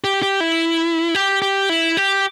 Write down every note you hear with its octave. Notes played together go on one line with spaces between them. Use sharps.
G4
G4
E4
G4
G4
E4
G4